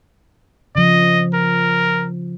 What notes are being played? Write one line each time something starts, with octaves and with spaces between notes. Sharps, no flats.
C#3 F3 D#5
A#4